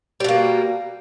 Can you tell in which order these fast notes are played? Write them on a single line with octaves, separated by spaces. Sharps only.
G3 B2 A#3